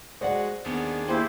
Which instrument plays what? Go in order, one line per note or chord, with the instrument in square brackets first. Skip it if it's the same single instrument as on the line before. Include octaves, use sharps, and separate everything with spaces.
[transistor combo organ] G#3 F#4 [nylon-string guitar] C5 D5 F#5
[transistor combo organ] D#2 D4 G#4 [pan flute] B3
[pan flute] A#3 [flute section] E4 G4 C5